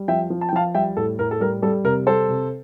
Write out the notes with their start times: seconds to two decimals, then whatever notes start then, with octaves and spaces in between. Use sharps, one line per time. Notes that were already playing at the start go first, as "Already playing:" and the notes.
Already playing: G3
0.08 F3 E5 G5
0.30 F3
0.41 A5
0.49 G5
0.53 F3 F5 A5
0.75 G3 E5 G5
0.96 A2 A4
1.19 A2 A#4
1.31 A4
1.40 G3 A#4
1.62 G3 A4
1.84 C3 A#4
2.07 G3 A4 C5
2.29 C3